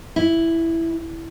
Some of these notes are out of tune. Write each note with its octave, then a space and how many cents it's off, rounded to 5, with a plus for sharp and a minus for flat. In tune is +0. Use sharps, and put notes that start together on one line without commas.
E4 +0